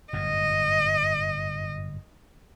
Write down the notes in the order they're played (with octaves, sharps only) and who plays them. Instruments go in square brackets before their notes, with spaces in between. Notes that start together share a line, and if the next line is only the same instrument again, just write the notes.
[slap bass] G1 F#2 A2 [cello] D#5